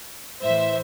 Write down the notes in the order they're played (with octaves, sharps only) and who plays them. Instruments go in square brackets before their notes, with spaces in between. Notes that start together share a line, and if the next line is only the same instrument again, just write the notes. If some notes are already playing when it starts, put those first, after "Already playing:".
[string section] A2 E3 C5 E5